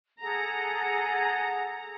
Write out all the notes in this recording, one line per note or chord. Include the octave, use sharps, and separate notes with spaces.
G#4 A4 F#5 A#5